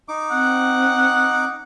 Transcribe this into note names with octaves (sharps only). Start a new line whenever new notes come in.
D#4 D6
C4 F#5